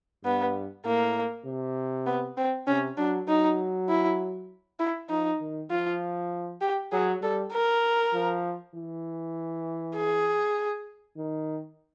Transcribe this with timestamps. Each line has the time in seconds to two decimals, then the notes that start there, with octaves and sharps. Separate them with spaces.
0.24 G2 B3
0.85 A2 A#3
1.45 C3
2.06 B3
2.37 C4
2.67 C3 C#4
2.97 F#3 D4
3.28 F#3 D#4
3.89 E4
4.79 E4
5.10 F3 D#4
5.41 D#3
5.71 F3 F4
6.61 G4
6.92 F#3 G#4
7.22 G3 A4
7.53 A#4
8.13 F3
8.75 E3
9.96 G#4
11.17 D#3